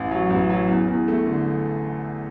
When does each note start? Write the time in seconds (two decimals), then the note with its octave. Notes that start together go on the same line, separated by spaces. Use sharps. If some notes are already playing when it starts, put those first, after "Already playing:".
Already playing: A1
0.11 F#3
0.30 A1
0.50 F#3
0.69 E2
0.88 E2
1.08 A3
1.26 D3